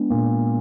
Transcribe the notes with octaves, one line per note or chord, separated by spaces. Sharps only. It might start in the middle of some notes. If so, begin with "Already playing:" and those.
Already playing: G#3 B3 D4
A#2